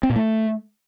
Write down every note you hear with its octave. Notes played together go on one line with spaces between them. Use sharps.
C4
A#2
A3